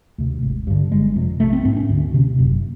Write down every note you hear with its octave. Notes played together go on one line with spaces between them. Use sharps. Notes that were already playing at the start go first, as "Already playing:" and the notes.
D2 C3
G#1
G2 D3
G1 G#3
F2 C3
A#1 A3
C4
G#2 C4
C#4
D2
C3
F#1